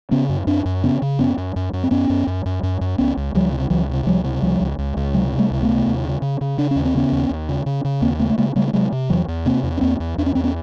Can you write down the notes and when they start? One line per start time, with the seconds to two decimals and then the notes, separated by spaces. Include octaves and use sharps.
0.11 C#3 B3 C#4
0.29 F#2
0.47 F#2 C4 D4
0.65 F#2
0.83 C#3 B3 C#4
1.02 C#3
1.19 F#2 B3 C#4
1.38 F#2
1.56 F#2
1.73 F#2
1.84 C4
1.91 F#2 B3 C#4
2.10 F#2
2.27 F#2
2.45 F#2
2.63 F#2
2.81 F#2
2.98 C#2 B3 C#4
3.17 C#2
3.34 C#2 F3 G3
3.52 C3
3.70 C#2 E3 F#3
3.89 C3
4.06 C#2 F3 G3
4.25 C3
4.42 C#2 F3 G3
4.61 C#2
4.78 C#2
4.96 C#2
5.14 C3 F#3 G#3
5.32 C3
5.38 G3 A3
5.51 C#2
5.63 A3 B3
5.69 C3
5.87 D#2
6.04 C#3
6.22 C#3
6.41 C#3
6.58 C#3 D4
6.71 D#2 C#4
6.85 C4
6.95 C#3 B3 C#4
7.12 D#2
7.30 D#2
7.49 C#3
7.66 C#3
7.84 C#3
8.02 D#2 A#3 C4
8.20 C#3 A3 B3
8.30 A3
8.38 C#3 G#3 A#3
8.56 C#3 G3 A3
8.68 A3
8.73 C3 F#3 G#3
8.92 C3
9.10 E2 E3 F#3
9.28 E2
9.45 C3 A#3 C4
9.63 E2
9.77 C#4
9.81 E2 A#3 C4
10.00 E2
10.18 E2 D4
10.26 C#4
10.35 E2 C4
10.44 B3 C#4